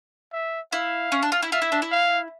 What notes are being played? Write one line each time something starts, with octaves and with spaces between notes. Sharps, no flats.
E5
E4 F5
C#4
D4
F4
E4
F4 E5
E4
D4
E4
F5